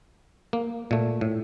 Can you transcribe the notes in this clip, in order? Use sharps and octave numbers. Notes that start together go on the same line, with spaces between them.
A#3
A#2 A3
A2